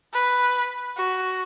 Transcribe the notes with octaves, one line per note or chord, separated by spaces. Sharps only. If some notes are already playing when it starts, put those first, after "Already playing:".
B4
F#4